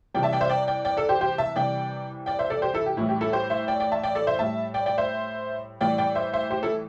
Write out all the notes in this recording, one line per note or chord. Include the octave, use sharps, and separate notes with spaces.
C3 E3 G3 D5 G5
E5 A5
D5 G5
C5 E5
D5 G5
D5 G5
D5 G5
A4 D5
G4 C5
G4 C5
E5 A5
C3 E3 G3 D5 G5
D5 G5
C5 E5
A4 D5
G4 C5
E4 A4
G4
A2 E3 G3 E4
G4
E4 A4
G4 C5
C5 E5
D5 G5
D5 G5
E5 A5
D5 G5
A4 D5
C5 E5
A2 G3 E5 A5
D5 G5
D5 G5
C5 E5
A2 E3 G3 D5 G5
D5 G5
C5 E5
C5 E5
G4 C5
E4 A4